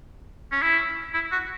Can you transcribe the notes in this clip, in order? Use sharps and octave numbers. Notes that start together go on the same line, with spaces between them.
C#4
E4
E4
F#4